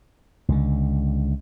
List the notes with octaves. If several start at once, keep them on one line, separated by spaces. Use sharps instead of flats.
C#2 D3